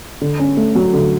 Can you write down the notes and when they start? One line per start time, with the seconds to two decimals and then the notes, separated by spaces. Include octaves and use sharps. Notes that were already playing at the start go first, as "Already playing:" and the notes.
0.21 D3
0.39 C#4
0.57 A3
0.75 F#3
0.94 D3